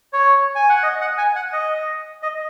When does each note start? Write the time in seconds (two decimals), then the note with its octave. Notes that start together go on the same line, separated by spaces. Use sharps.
0.13 C#5
0.55 G#5
0.69 F#5
0.83 D#5
1.01 F#5
1.18 G#5
1.36 F#5
1.53 D#5
2.23 D#5